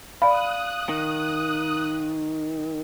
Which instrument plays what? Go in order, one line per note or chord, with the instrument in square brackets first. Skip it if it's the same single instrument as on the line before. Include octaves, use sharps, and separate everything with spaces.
[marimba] D5 B5 [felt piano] F5 [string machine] D#6 F#6
[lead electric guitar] D#3